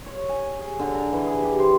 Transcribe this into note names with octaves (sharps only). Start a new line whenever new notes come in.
C#5
G#5
G#4
D3
A#5
E3
G#4
G4
C5